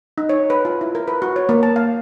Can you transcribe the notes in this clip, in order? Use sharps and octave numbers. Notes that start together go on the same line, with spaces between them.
D#4
C#5
B4
F4
E4
A#4
B4
F#4
C#5
A#3
A5
F5